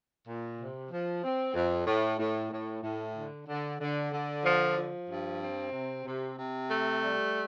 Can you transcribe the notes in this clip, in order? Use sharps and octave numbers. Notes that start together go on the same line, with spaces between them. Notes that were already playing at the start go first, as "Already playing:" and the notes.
A#2
C3
F3
C4
F2
A2
A2
A2
A2
D3
D3
D3
D3
F3
F3
G2
C4
C3
C3
C3
A3
G3